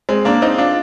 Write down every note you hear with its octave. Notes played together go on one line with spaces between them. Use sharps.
G#3 C4
A#3 D4
C4 D#4
D4 F4